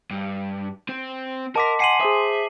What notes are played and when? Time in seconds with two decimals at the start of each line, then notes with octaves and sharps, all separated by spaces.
0.11 G2
0.89 C4 C5
1.56 A#4 D#5 F#5 A5 C6 D6 B6
1.80 F#5 G#5 C6 C7 D#7 F#7
2.01 G#4 C5 E5 D#6